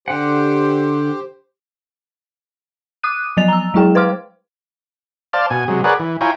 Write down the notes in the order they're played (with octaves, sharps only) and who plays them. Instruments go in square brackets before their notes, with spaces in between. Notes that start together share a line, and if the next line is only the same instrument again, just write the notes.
[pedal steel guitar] D3 F#5 [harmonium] G4 C5
[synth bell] D6 D#6 F#6 D#7
F3 F#3 B3 D#5 A6 F7
A#5 E6
F#3 G#3 E4 G#4 G5
B4 C5 F5 C6 D6 F6
[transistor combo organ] C5 D5 F5 A5
B2 G#5
C3 F#3 G#3
G#4 A#4 B4 C#5 D5 F#5
E3
E4 F4 C#5 G5 G#5 A#5